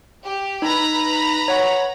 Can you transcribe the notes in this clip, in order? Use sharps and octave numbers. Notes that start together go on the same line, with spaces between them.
G4
D#4 B4 A#5 B5
C#5 F#5 C#6